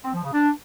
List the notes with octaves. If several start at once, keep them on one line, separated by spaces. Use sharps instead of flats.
C4
F3
C#3
D4